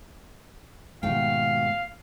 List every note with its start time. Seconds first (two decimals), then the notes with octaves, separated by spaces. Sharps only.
1.03 D#2 G#2 B2 A3 F5 G5